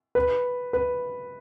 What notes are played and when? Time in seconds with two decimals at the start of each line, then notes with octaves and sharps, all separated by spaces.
0.15 B4
0.73 B4